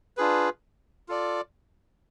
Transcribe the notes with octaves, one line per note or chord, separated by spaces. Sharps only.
D4 F4 G#4 B4
F4 A4 D5